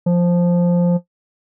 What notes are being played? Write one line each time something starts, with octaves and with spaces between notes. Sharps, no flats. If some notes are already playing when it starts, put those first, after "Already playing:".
F3